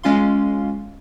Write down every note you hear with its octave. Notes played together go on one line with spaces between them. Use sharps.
G#3 C#4 F4 F5 C6